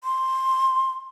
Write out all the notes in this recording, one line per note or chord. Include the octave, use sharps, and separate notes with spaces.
C6